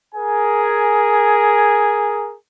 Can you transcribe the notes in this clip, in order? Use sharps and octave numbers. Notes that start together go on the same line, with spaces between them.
G#4 A#4 G#5